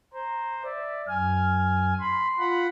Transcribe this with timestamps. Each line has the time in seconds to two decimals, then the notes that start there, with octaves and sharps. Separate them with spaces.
0.13 C5 A#5
0.64 D5 E5
1.08 F#2 G#5 F6
1.59 F6
2.01 B5 C6
2.39 F4 F#5 B5